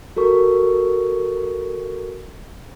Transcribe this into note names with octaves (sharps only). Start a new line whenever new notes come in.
F#4 A4 A#4 C#6